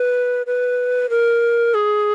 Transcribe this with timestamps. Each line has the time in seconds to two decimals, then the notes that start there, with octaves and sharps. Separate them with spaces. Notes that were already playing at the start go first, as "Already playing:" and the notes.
Already playing: B4
0.46 B4
1.10 A#4
1.74 G#4